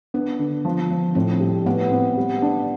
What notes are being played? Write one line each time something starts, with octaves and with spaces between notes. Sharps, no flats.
B3 D4
D3
F3
F3
A2 C4
G3
A2 B3
C4
G3
D4